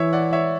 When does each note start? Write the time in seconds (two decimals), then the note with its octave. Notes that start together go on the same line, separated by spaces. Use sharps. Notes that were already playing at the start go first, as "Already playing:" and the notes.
Already playing: E3 C#5 E5
0.13 D5 F#5
0.33 C#5 E5